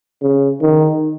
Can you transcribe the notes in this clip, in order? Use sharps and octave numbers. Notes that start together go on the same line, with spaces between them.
C#3
D#3